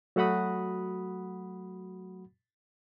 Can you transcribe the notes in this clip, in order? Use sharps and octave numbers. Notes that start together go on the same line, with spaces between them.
F#3 A3 F#4 F#5 B5 D#6